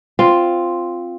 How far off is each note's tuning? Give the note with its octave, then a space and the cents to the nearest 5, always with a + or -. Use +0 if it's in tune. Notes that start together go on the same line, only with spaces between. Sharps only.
C4 +0 F4 +0